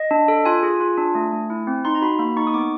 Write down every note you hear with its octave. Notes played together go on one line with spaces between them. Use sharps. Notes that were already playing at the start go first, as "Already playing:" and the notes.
Already playing: D#5
D4
A4
F4 G#5
G#4
F4
D4
A3
A3
E4
C4
D#4 C6
A#5
F#4 B5
A#3 B5
D#4 C#6
D#6
B3 D6